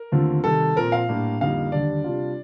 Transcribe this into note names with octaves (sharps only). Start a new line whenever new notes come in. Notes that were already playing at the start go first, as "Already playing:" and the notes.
Already playing: A#4
D#2 D3 A3 C4 F4
C3 D#3 G3 A4
A#2 F3 C4 A#4
F5
A2 G3 A#3 D4
F2 D3 G3 A#3 D#4 F5
D#2 D3 G3 D4 D5
C3 G3 D4 F4